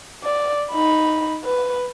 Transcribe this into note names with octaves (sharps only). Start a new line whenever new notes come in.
D5
D#4 B5
B4